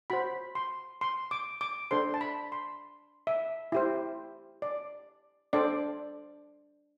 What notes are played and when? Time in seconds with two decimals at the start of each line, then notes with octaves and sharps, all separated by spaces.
0.10 F#4 C5 B5
0.55 C6
1.01 C6
1.31 D6
1.61 D6
1.91 D4 A4 C5 C6
2.14 A5
2.21 B5
2.52 C6
3.27 E5
3.72 E4 G4 C5
4.62 D5
5.53 D4 A4 C5 D5